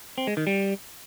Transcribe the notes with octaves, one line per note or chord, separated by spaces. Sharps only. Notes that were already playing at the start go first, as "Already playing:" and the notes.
C4
G#3
D#3
G3